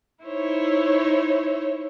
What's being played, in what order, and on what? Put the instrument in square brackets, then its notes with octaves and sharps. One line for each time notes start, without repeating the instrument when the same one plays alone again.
[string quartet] D#4 E4 C5 C#5